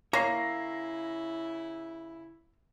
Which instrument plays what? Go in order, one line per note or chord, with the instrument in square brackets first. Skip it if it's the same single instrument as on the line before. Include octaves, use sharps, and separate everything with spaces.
[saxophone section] C#3 E4 [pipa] A#3 [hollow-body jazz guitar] C#5 [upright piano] A#6 C7